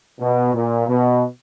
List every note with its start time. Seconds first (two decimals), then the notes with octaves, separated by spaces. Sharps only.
0.20 B2
0.54 A#2
0.88 B2